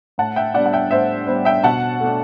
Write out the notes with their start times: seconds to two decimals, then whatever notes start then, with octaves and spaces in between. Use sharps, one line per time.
0.18 A2 F#5 A5
0.36 E5 G5
0.54 G3 B3 D4 D5 F#5
0.66 F#5
0.73 E5 G5
0.91 A2 C5 E5
1.27 G3 B3 D4 C5
1.45 E5 G5
1.63 B2 F#5 A5
2.01 A3 D4